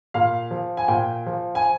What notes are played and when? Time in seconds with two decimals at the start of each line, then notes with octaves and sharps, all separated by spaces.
0.14 A#2 F5
0.51 F3
0.77 G#5
0.88 A#2 G5
1.26 F3
1.55 G#5